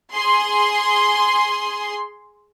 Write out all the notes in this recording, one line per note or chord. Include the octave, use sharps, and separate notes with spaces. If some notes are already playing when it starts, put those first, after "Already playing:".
G#4 C6